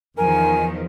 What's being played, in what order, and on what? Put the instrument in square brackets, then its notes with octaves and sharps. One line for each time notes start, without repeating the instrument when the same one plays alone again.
[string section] E2 D#3 F3 [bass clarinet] A#4 [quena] G#5